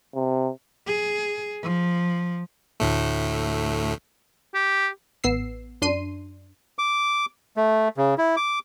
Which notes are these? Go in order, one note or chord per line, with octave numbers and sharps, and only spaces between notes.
C3
G#4
F3
D2 A2 A3
G4
A1 B3 E6 C7
F#2 D4 C6 C7 D#7
D6
A3
C#3
E4
D6